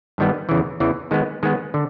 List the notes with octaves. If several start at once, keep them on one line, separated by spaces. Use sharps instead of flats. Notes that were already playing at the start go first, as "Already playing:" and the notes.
G2 D#3 G3 B3
E2 C#3 E3
E2 C#3 E3
D#3 G#3 B3
D#3 G#3 B3
D3